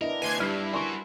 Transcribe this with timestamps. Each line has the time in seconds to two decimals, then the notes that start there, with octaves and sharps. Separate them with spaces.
0.01 B3 D4 E4 A#4 D#5
0.22 D2 B4 D5 G#5 C6 G#6
0.40 G2 G3 D4 E4 F6 C7
0.73 F#4 A#4 G#5 C6 C#6